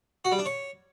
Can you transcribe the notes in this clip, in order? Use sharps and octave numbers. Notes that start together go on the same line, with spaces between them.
F#4
G3
D4
C#5